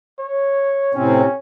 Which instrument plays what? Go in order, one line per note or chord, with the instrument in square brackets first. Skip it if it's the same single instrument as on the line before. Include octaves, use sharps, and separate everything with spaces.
[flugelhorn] C#5
[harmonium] A2 C3 C4 [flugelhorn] C#4